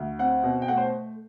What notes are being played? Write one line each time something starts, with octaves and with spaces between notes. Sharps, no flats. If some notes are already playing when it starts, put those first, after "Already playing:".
Already playing: D2
C4 F#5
B2
G5
A3 F#5
C5